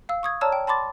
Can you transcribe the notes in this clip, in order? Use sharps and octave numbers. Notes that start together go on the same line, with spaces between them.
F5 E6
C#6 D#6 G#6
C#5 D5 A5 A#5 E6 F6
G5
A5 B5 C6 D6 A6